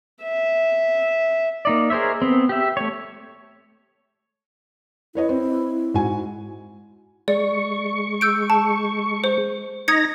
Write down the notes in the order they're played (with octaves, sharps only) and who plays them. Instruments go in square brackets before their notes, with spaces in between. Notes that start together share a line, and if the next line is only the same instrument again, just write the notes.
[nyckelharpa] E5
[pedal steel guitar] A#3 D#4 D5
G#4 A#4 C5 C#5 E5
B3 C4
G4 E5
A3 C#5
[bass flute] E4 [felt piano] B4 C#5 D#5
[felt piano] C4
G#2 F#4 G#5
[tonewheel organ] G#3 C#6 [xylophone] D5
[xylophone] E6 G6 D7
A5
C5
[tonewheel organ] D#4 A#5 A#6 [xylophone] D#6 G#6 C#7